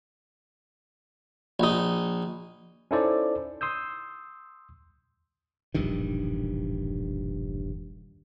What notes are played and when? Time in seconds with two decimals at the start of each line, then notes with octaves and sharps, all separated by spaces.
1.60 A#1 D#4
2.91 C#4 D#4 E4 A4 C5 D5
3.61 C6 D#6 E6 G6
5.74 E1 A#1 G2 D#3